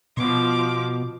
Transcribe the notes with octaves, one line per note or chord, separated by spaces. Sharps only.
B2 F3 D6